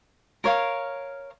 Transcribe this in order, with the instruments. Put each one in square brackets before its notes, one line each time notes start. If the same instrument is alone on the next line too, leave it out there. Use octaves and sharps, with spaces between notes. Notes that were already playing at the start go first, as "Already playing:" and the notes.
[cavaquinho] A#4 C#5 F5